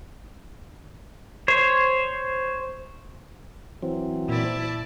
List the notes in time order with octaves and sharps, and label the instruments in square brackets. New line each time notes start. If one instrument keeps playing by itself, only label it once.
[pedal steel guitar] C5 C#5
[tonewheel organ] E3 F#3 C4
[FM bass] A#2 [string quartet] E4 D5 A5